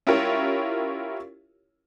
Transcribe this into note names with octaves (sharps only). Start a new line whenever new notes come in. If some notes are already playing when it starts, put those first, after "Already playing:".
C#4 E4 F4 G4 A#4 C#5